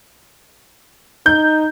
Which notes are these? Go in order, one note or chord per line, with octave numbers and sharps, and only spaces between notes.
D#4 G6